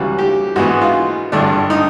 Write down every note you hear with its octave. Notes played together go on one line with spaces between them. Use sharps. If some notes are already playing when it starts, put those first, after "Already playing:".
Already playing: C#2 C#3 E3 G3 F#4
G4
G#2 E3 G#3 B3 F#4
F4
G#1 G2 D3 D4
D#4